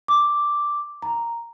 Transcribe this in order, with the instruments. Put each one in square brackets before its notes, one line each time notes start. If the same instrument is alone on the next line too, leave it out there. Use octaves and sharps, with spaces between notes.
[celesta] D6
A#5